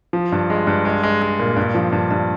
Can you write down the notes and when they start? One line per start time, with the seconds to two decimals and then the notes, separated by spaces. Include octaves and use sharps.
0.13 F3
0.32 G2
0.50 G#3
0.67 G2
0.85 G#3
1.03 G#3
1.22 G#3
1.39 A#2
1.57 G2
1.75 F3
1.92 G2
2.11 G2